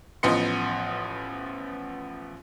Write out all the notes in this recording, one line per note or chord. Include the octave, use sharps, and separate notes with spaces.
A1 F3 B3 D#5 C6 C#7